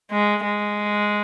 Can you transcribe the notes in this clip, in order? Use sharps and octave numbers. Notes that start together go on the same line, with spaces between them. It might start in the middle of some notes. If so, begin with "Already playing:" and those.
G#3
G#3